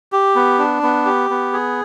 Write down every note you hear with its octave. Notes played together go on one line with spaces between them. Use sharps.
G4
B3
D4
B3
G4
B3
G#4